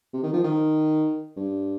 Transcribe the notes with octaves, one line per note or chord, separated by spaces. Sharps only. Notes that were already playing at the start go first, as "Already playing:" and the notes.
C3
D#3
F3
D#3
G2